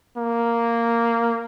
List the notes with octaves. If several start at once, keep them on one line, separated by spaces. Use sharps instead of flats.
A#3